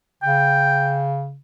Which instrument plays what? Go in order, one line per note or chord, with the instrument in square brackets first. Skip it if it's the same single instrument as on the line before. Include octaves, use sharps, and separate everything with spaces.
[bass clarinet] C#3 [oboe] G5